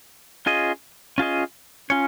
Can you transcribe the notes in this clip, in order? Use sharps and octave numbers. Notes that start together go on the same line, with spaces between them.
C#4 F4 G#4 D#5
C#4 F4 G#4 D#5
C#4 F4 C#5